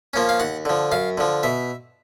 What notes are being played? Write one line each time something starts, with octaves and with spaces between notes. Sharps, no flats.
F3 A#3 C#4
F5
D#2 F#5
D3 F3
F#2 F5
D3 F3
B2 E5